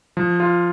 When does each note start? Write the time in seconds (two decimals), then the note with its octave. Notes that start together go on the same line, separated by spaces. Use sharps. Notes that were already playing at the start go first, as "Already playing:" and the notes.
0.17 F3
0.40 F4